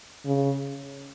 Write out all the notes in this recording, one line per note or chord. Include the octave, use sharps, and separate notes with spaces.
C#3